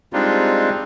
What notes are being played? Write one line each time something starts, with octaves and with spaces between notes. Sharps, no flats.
G3 G#3 C4 D4 D#4 F4